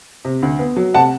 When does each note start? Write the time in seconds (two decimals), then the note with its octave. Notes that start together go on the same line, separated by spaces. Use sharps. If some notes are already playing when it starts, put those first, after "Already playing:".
0.25 C3
0.42 D2
0.59 B3
0.76 F#3
0.94 C3 F#5 A5